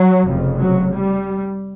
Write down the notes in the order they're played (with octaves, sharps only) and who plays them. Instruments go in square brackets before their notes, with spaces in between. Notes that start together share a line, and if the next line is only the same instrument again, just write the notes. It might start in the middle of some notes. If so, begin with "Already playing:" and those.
Already playing: [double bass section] F#3
F1 F2 C#3
F#3
G3